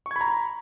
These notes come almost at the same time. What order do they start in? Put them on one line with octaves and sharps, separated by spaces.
C#6 G#6 B5 A#5